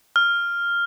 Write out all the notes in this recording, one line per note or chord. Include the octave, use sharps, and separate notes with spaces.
F6